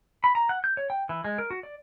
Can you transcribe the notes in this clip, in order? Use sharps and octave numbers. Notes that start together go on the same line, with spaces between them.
B5
A#5
F#5
G6
C#5
G5
E3
G#3
A#4
F#4
D5